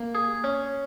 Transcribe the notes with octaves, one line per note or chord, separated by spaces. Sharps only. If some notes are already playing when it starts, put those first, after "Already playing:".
Already playing: A#3
G#4
C#4